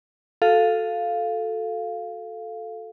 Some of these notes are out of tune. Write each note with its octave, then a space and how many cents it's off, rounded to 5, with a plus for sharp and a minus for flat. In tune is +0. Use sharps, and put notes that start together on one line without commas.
F#4 -20 A4 +0 F5 +0